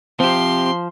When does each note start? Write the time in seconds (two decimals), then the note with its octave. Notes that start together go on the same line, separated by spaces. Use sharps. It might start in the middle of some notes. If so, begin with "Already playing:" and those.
0.20 F3 C4 G4 C6